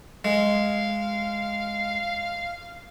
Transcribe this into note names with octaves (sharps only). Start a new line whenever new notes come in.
G#3 F5